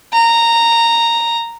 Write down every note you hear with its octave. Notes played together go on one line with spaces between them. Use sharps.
A#5